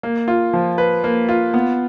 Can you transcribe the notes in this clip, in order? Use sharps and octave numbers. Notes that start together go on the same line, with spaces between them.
A#3
F4
F3
B4
A#3
F4
B3